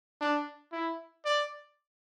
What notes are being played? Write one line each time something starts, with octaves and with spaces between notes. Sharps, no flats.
D4
E4
D5